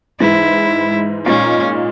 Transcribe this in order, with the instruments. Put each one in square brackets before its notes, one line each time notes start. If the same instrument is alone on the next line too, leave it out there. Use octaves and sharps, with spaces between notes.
[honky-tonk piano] G#2 E3 G#3 [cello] E4
[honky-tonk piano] A#2 G#3 D#4 [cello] C#4